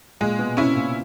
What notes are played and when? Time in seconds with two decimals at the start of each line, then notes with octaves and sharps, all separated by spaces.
0.21 A#2 G#3
0.39 B2
0.57 C3 C#4 E4
0.75 A#2